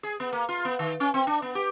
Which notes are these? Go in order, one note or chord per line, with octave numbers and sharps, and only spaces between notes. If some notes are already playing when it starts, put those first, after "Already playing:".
G#4
B3
A#3
F4
B3
D#3
C#4
C4
D4
B3
G4